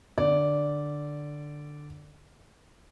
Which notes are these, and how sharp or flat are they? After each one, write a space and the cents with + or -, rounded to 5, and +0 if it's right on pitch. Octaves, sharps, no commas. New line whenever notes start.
D3 +15 D5 -10